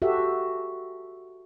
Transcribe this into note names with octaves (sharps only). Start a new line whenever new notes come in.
F#4 G4 A4 E5